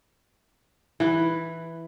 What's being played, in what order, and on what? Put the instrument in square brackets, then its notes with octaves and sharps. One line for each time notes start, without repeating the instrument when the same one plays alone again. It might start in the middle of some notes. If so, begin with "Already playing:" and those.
[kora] E3 B4